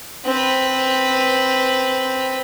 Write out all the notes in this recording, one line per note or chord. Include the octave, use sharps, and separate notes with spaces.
C4 B4